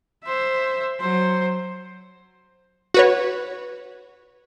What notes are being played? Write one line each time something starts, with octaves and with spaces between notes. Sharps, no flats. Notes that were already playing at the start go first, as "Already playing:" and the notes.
C5 E5
F#3 C5
F#4 B4 C#5